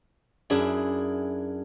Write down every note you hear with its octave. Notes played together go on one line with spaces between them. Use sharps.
F#2 D4 E4 G#4